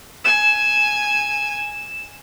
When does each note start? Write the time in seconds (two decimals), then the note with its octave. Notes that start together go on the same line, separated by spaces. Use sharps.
0.25 G#5 E7